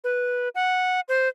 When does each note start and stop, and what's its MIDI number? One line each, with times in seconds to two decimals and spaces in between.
0.04 0.49 71
0.55 1.00 78
1.09 1.29 72